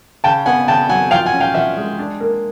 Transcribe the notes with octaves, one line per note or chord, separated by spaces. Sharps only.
C#3 G5 A5
B3 F#5 G#5
C#3 G5 A5
F#3 F#5 G#5
F3 F5 G5
F#5 G#5
C#4
F5 G5
F3 E5 F#5
G#3
D4
A#3